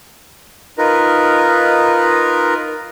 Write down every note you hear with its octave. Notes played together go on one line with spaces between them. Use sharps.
D#4 F4 A#4 B4 D#5